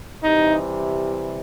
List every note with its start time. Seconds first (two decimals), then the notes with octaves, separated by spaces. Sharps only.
0.23 C3 E3 G3 D#4